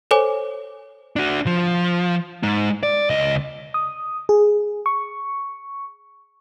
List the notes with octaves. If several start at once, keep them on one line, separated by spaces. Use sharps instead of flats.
A4 C5 C#5 G#5 D6
D4 F#4
F3
G#3 D#4
D5
C#2 D#5
D#6
G#4
C#6